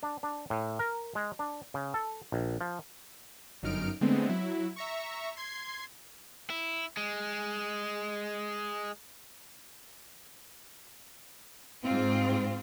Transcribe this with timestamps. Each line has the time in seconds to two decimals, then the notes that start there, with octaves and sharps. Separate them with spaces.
0.03 D4
0.23 D4
0.50 A2
0.79 A#4
1.15 G#3
1.39 D4
1.74 C#3
1.94 A4
2.32 A#1
2.61 F3
3.62 G1 F#2 D#4 F6 D7
4.01 D3 G#3 A3 B3 C4
4.29 F#3 E4
4.76 E5 A#5 C#6
5.37 C6 G#6 C7
6.50 E4
6.97 G#3
11.84 G#2 C4 F4